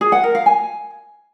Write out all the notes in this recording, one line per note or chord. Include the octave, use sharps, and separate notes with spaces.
G#4
F#5
A#4
F5
G#5